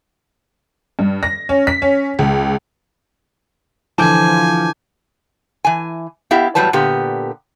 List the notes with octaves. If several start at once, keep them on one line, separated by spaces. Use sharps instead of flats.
G2
A#6
C#4
B6
C#4
C#2
D3 E3 F3 G#5 A5 D6 G6
E3 G#5
B3 E4 G4 E5 F5
E2 A2 F#3 G3 B4 A5
A#2 D3 B3 G4